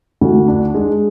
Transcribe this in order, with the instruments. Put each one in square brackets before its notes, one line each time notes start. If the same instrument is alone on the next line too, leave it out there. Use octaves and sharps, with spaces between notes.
[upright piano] D2
D4
G#3